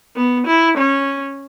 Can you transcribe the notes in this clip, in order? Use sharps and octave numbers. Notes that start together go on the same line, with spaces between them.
B3
E4
C#4